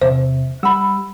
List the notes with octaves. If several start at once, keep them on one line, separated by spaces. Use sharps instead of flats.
E2 C3 C5 E5
G3 F#5 B5 E6